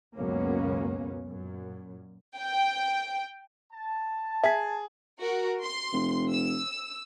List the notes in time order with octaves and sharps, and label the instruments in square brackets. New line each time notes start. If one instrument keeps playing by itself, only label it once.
[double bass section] C#2 F#2 B2 A#3 B3 C#4
F#2 A#2
[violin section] G5
[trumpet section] A5
[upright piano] G#4 [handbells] E5 B6
[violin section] F#4 A#4
C6
[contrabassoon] F1
[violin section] E6